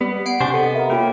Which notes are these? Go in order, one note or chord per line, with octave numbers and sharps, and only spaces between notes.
G3 B3
D5 F#5 C7 D7
C3 D4 G4 C5 G#5 D6
B3 A4 D#5
A#4 E5 A#5
A#3 F4 C#5 G5